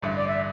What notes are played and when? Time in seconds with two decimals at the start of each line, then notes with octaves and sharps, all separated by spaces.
0.02 A1 G2 D3 E5
0.16 D5
0.28 E5